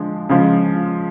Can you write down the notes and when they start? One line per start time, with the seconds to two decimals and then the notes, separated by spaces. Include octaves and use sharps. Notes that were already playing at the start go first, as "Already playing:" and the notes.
Already playing: D3 F3 G#3
0.29 C#3 F3 G#3